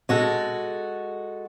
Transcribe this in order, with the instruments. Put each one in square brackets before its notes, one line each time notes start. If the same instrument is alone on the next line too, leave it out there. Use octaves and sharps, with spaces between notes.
[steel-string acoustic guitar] G#3 F#4 A4